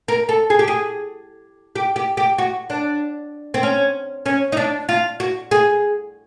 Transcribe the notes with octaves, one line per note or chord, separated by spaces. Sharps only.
A#4
A4
G#4
G4
G#4
G4
G4
G4
F#4
D4
C4
C#4
C#4
D#4
D4
F4
F#4
G#4